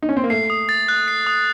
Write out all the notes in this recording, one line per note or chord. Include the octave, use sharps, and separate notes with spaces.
D#4
C#4
C4
A#3
A3 C7
D#6
A6
F#6
C7
D#6